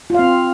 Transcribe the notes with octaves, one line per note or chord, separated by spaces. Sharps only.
C4 F4 F5